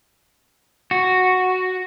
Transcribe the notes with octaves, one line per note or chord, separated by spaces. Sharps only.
F#4